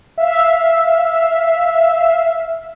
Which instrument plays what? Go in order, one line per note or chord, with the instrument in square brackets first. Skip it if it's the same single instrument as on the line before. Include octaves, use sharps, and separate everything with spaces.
[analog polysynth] E5 F5